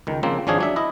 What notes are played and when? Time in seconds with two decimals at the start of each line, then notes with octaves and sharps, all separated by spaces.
0.07 C#2 D#3
0.23 C#3 F3 A#3 C4
0.47 G#1 F3 C#4 D4 G#4 G#5
0.58 F#3 D4 E5
0.76 E4 D#5